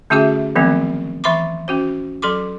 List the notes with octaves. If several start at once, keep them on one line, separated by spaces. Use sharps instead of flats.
D3 A3 C#4 F#4 G#4 E5
D#3 F3 F#3 A3 B3 C4
E3 E5 B5 C6 D6
C#4 F#4 C5
F#3 A4 C6 D6